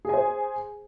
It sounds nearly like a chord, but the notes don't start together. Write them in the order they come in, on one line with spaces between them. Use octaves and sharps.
G#4 G#5 C5